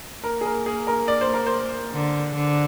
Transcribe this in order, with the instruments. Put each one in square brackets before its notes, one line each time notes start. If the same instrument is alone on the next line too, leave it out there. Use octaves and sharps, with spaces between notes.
[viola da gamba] A#3 [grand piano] A#4
[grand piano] G#4
A#4
G#4
A#4
D5
C5
A#4
C5
[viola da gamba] D3
D3